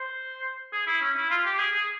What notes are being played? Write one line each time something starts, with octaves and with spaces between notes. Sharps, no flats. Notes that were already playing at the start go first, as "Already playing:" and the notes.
Already playing: C5
G#4
E4
C#4
E4
F4
G4
G#4
G#4